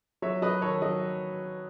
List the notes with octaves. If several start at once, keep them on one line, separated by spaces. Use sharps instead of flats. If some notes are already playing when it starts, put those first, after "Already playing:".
F#3 C#5 E5
F#3 B4 D#5
D#3 A4 C#5
F#3 D#5